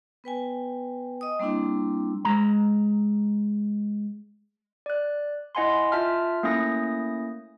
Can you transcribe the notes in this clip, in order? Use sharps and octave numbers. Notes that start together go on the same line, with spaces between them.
B3 B4 G5 G#5
D#5 D#6
G3 A#3 C4 D4 E4
G#3 A#5
D5 F#6
E4 D#5 F#5 G#5 B5 C6
F4 E5 A5 F6
A3 A#3 C#4 E4 D#6 A#6